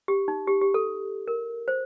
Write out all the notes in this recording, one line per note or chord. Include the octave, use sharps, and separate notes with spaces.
G4
D#4
G4
G4
A4
A#4
C5